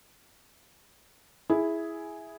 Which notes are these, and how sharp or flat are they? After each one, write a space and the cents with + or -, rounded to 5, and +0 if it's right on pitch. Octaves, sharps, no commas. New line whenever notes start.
E4 +0 G#4 +0